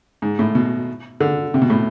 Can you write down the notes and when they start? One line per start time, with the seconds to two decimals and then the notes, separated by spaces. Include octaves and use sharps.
0.22 G#2
0.39 A2
0.55 B2
1.20 D3
1.54 C3
1.62 B2
1.70 A2